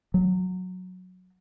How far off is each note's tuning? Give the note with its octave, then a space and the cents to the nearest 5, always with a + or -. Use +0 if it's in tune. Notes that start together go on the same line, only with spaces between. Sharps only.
F#3 -10